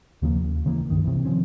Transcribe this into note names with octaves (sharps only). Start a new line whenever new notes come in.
D#2 C#3 F3 A#3
D#2
D#1 C#3 E3 A#3
C2 G2 D#3
C3 E3
D#3 F3 C4 C#4